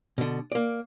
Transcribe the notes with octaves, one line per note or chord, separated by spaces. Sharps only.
B2 D3
A#3 D5